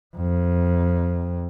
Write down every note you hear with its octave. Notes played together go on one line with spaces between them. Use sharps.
F2